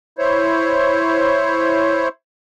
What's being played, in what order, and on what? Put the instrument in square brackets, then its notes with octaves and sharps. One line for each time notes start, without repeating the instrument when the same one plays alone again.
[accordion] E4 C5 C#5